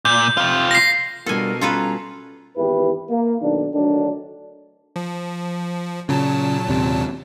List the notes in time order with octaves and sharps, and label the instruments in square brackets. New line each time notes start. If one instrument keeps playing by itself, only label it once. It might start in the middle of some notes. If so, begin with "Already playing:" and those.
[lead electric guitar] A#2 [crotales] G6
[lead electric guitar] C3 F4
[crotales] A#6 C7
[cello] B2 [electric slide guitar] G3 D4 F4 [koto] A4 G#5 [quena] A#4
[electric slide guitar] G3 C#4 [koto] F4 A4 B4 [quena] A#5
[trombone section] G#1 E2 E4 G4 B4
A#3
B1 D#3 D4
D2 D3 D#3 F#3 D4
[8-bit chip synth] F3
[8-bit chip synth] A#2 F#3 A5 [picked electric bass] C#3
[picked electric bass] D#2 C3